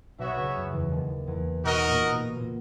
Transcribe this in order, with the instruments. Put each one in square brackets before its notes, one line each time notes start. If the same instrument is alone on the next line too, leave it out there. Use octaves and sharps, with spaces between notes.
[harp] B1 B2 [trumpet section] B3 F#4 C#5 E5
[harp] C#2 C#3
F#2 F#3
E2 E3
D#2 D#3
E2 E3
[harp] B2 B3 [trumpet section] D#4 F#4 A#4 D#5
[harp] A#2 A#3
B2 B3
A#2 A#3